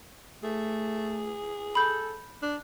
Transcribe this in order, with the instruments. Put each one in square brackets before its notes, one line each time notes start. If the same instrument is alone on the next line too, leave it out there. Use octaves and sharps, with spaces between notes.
[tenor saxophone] A3 [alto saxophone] G#4
[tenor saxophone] A4 [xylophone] B5 G6
[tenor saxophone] D4